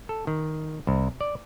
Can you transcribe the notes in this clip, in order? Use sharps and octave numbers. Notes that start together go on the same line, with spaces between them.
A4
D#3
C2
D5